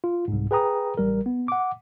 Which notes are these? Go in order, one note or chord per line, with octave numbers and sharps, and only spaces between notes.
F4
C2 G#2
G#4 B4 G5 A#5 D#6
A1 G3 A#4
B3
F#5 D6